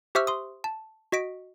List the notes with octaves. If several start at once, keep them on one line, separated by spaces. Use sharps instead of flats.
G4 C5 E5 C#6 E6 F6
C6 D#6
A5
F#4 D#5 B6 D7